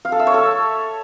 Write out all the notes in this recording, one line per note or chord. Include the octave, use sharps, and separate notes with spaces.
F5
A4
E5
C#5
A4